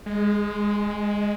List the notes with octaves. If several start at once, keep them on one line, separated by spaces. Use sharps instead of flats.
G#3